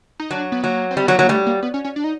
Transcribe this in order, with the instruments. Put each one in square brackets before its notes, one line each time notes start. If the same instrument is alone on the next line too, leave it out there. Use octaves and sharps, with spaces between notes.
[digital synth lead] D#4
[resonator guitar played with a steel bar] F#3 [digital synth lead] D4
[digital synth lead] B3
[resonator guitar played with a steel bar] F#3 [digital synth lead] A#3
[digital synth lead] C4
[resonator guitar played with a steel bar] G3
[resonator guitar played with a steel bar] F#3 [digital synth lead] B3
[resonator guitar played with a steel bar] F#3 [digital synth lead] A#3
[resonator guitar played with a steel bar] G3 [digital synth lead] A3
[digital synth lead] A#3
B3
C#4
C#4
D4
D#4